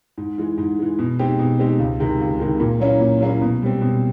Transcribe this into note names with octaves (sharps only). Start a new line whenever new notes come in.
G#2
E3 G#3
G#2
E3 G#3
B2
G#3 C4 D#4 G4
B2
G#3 C4 D#4 G4
C#2
C3 D#3 G#3
C#2
C3 D#3 G#3
A#2
F#3 A#3 C#4 E4
A#2
F#3 A#3 C#4 E4
B2
G3 C4
B2